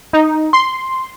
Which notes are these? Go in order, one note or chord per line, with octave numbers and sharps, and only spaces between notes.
D#4
C6